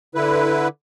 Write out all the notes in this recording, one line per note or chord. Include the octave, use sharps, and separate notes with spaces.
D3 E4 B4